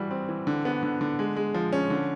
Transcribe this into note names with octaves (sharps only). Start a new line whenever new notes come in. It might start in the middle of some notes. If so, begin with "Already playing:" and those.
Already playing: E3 G3 F#4
C4
E3
D3
B3
D3
D3
G#3
G#3
F3
C#4
D3